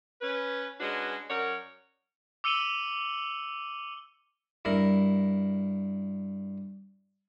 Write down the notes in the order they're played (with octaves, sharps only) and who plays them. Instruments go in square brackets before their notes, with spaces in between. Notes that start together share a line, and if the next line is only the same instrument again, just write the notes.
[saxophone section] C#4 B4
G#3 C#4 D4 F#4 B4
F#2 A#4 C#5 D5 F#5
[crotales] D6 E6 C#7 D#7 F#7 G7
[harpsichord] G2 E4 A#4